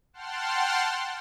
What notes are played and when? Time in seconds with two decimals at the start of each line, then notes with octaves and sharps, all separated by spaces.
0.13 F#5 G5 A5 C6 F6